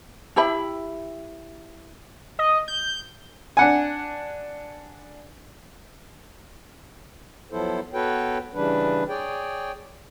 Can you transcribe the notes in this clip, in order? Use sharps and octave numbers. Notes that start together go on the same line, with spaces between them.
E4 G4 E5 B5
D#5
G6
D4 F#5 G#5
F3 F#3 B3 E4 A4 C5
B3 F#4 A4 B4 C#5 G5
C#3 E3 G3 D4 B4
G#4 C#5 D5 G5